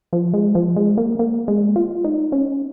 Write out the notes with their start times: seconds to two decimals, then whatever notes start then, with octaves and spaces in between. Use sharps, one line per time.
0.13 F3
0.34 G#3
0.55 F3
0.76 G#3
0.98 A#3
1.19 A#3
1.48 G#3
1.76 F4
2.04 D#4
2.32 C#4